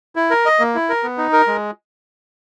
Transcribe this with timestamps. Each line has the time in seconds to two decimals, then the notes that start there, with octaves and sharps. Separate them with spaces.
0.16 E4
0.31 A#4
0.46 D#5
0.60 A#3
0.75 E4
0.89 A#4
1.03 B3
1.18 D#4
1.33 A#4
1.47 G#3